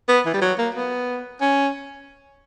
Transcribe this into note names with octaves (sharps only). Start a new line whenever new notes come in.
B3
E3
G3
F#3
A#3
B3
C#4